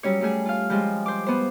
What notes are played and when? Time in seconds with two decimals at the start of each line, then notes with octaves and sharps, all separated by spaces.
0.03 F#3 G3 C#4 C#5
0.21 G3 A3 G#4
0.45 F4 F5
0.70 F3 G3 G#3 F4
1.06 C5 D6
1.26 B3 C5